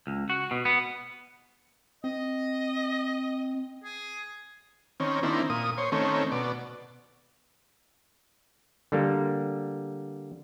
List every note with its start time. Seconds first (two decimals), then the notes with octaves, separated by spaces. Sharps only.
0.07 C#2
0.30 F#4
0.51 B2
0.65 B3
2.04 C4 D#5
3.84 G#4
5.00 D#3 C4 C#4
5.23 D#3 A#3 C4 D4 E4
5.50 A#2 D#6
5.78 C5 C#5
5.92 D#3 A3 C4 C#4
6.32 B2 D5
8.92 D3 G3 A#3